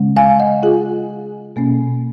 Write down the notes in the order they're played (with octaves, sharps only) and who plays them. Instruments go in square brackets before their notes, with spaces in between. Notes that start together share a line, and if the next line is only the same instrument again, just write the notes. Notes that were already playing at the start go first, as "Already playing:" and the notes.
Already playing: [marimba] C#3 G#3 C#4
F5 G#5
D#5 F#5
F4 G#4
B2 A#3 C#4